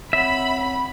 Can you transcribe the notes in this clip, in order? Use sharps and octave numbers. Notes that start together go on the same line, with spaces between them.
C4 C#5 E5 F#5 B5